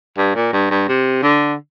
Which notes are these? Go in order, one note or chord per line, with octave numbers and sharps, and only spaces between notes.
G2
A#2
G2
G2
C3
D3